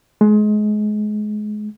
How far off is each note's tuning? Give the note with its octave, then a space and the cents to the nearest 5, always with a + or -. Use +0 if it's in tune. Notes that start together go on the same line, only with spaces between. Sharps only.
G#3 +25